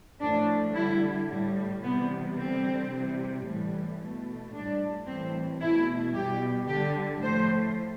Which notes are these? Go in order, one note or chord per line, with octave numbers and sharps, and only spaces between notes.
A2 F3 A3 D4
D3 G3 E4
A2 G3
C3 E3 G3 B3
D3 G3 C4
C3 E3 G3
A2 E3 G3
B2 A3
A2 G3 D4
A2 E3 G3 C4
B2 A3 E4
B2 G3 G4
D3 G3 G4
A2 F3 A3 C5